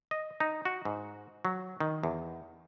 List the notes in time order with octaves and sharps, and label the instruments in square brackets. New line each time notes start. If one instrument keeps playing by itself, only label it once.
[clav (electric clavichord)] D#5
D#4
F#4
G#2
F#3
D#3
E2